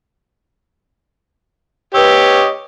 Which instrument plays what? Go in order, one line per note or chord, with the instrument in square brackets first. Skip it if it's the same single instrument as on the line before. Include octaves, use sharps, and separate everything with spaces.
[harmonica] G4 C#5 D#5 [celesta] B4 E6